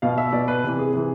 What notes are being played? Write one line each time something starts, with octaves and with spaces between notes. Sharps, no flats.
B2 F5
E5
B2 D5
B4
C3 E3
G#4
C3 E3